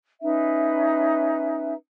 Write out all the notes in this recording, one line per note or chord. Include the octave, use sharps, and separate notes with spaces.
C#4 D#4 B4 E5